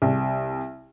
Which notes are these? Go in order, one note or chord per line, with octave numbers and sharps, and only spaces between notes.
C2